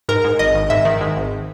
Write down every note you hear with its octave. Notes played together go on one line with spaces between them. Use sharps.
G#2 A#4
G#2
G#1 D#5
G#1
G#2 E5
D#3
G#2
G#1